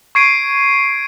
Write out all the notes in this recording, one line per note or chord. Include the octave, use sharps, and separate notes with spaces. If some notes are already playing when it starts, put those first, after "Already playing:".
C#6 G#6 C7 D7 D#7